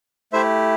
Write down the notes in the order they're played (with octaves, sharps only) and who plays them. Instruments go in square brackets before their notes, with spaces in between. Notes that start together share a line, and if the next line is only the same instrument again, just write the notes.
[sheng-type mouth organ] A3 E4 G4 C5 E5